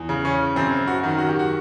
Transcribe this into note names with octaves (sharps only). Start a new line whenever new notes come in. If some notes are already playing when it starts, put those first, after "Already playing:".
Already playing: E2
C#3
C#4
F#2 C4
F#4
D#3
F#4
G4
F#4